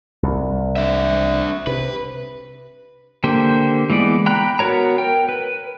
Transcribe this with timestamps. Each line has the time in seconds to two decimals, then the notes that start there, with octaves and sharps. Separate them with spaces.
0.23 C2
0.76 D4 E5
1.67 C3 B4
3.24 D3 A#3 G4 C5
3.90 E3 G#3 B3 D5
4.26 G5 A#5 B5 F#6
4.59 B3 F#4 A#4 C#5 A#5
4.98 A#4 G5
5.29 B4